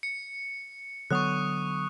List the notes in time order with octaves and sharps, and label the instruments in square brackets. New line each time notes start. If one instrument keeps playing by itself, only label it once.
[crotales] C#7
[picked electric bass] D3 F#3 B3 [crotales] C#6 D#6 F#6